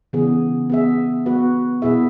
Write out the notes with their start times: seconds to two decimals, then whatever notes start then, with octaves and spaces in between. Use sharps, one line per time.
0.13 C#3 E3 B3 G#4
0.70 B3 G#4 E5
1.26 B3 F#4 B4
1.82 B2 B3 E4 G#4 E5